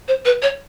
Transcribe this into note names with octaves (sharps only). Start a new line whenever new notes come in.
C5
B4
C#5